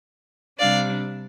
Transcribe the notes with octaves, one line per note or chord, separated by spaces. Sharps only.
C3 G3 D4 D5 F5